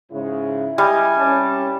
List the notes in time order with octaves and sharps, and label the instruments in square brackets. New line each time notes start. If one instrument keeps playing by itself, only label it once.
[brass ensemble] G#2 C#3 G#3 [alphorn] E4
[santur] G3 [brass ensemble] D#5 [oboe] G#5
[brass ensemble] C2 C#4 A5